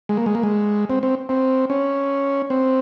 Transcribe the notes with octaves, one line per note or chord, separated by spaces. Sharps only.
G#3
A#3
G#3
A#3
G#3
C4
C4
C4
C#4
C4